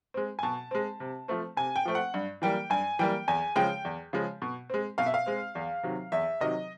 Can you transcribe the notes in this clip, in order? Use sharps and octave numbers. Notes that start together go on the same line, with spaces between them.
G#3 C4
G#5
B2 A5
G#3 C4
C3
F3 A3 C4
C3 G#5
G5
F3 A3 C4
F#5
G2
E3 G3 A#3 G5
G2 G#5
E3 G3 A#3 G5
E2 G#5
C#3 F3 G#3 G5
E2
C#3 F3 G#3
B2
G#3 C4
B2 F5
E5
F5
G#3 C4
E2
C3 D#3 F#3
E2 E5
C3 D#3 F#3 D#5